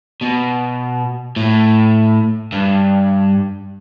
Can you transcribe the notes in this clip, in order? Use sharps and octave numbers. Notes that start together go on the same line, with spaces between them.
B2
A2
G2